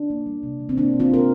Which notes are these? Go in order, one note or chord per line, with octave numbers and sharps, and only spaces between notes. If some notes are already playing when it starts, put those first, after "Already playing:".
Already playing: D4
A#3
G3
C3
G3
C4
A#3 D4
C3
C4 F4
C3 A#4